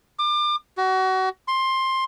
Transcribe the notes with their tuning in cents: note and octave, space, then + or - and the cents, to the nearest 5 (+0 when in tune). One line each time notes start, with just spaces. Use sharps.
D6 +35
F#4 +30
C6 +15